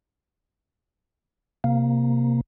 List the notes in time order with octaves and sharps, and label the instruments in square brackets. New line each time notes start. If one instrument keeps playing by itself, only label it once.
[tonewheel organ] C3 A#3